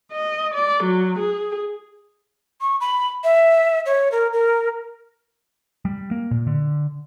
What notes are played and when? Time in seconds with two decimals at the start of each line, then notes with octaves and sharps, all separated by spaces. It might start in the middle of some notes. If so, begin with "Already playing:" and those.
0.14 D#5
0.54 D5
0.84 F#3
1.20 G#4
2.61 C#6
2.81 B5
3.24 E5
3.86 C#5
4.12 A#4
4.33 A#4
5.85 G3
6.11 A#3
6.31 A#2
6.47 D3